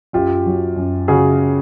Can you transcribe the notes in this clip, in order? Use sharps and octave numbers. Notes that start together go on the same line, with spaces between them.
F#2 F4 G4
F#3
F#2
C#3 F#4 G#4